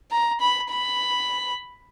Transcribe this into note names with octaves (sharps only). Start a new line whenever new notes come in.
A#5
B5
B5